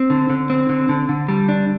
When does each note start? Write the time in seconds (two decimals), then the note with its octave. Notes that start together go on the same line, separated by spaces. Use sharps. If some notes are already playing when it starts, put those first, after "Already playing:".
Already playing: C4
0.10 D3
0.30 D3
0.50 C4
0.69 D3
0.89 D3
1.09 D3
1.28 G3
1.49 D4